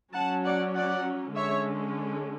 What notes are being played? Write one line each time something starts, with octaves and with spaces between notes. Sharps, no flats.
F#3 C#4 F#5 A5
D5 F#5
D5 F#5
D3 G#3 C#4 C#5 E5